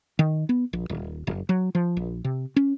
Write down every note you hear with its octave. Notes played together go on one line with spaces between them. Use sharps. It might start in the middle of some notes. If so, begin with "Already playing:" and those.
D#3
B3
A#1
D#1
F#1
F#3
F3
A#1
C3
C#4